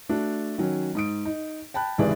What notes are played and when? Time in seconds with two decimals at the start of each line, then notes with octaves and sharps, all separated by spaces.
0.09 A3 D4 F#4
0.58 D#3 F#3 C#4
0.95 G#2 D#6 D7
1.25 D#4
1.74 G5 A5 B5 F#6
1.98 G#1 C#2 C3 E3 G#4 D5